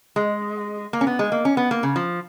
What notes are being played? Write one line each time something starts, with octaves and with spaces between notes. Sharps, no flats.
G#3
A#3
C#4
B3
G#3
A#3
C#4
B3
A#3
C#3
F3